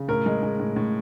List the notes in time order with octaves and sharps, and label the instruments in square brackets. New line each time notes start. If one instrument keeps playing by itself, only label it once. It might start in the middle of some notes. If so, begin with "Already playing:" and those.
Already playing: [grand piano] C#3
A2 A#4
G#3
G#3
A2
A2